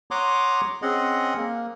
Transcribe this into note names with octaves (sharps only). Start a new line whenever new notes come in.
C#5 F#5 A#5 C6 D6 D#6
C4 C#4 G#4 D#5 F#5
A#3